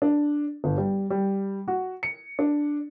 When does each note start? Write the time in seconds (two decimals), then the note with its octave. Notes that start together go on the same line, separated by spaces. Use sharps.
0.02 D4
0.64 G1
0.77 G3
1.10 G3
1.68 F#4
2.03 C#7
2.39 D4